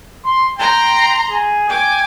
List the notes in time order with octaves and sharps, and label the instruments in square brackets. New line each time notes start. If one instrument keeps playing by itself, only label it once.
[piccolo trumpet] C6
[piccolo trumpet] G5 [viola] A#5 C6
[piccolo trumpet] G#4
[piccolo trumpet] G5 [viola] G#5 D6